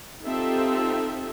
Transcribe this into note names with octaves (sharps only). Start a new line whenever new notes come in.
C4 D#4 F4 G4 A4 E5